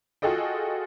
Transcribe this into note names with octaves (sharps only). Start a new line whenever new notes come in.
F4 F#4 G#4 A4 D#5 G5